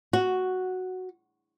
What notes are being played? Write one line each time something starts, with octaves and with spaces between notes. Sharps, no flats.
F#4